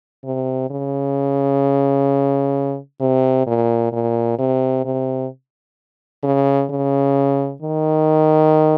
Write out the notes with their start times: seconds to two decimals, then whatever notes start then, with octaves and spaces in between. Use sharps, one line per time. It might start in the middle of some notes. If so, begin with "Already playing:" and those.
0.25 C3
0.70 C#3
3.00 C3
3.47 A#2
3.92 A#2
4.39 C3
4.85 C3
6.23 C#3
6.70 C#3
7.62 D#3